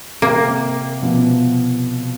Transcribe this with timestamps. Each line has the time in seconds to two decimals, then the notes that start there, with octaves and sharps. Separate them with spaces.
0.22 C3 A#3
1.02 B2 F3 B3